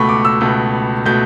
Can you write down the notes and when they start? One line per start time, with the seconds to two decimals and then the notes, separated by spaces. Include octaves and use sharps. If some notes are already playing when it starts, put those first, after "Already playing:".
Already playing: C#2 B2 A3 B5 C#6
0.09 D6
0.25 E6
0.41 C#2 B2 A3
1.06 B2 A3 G6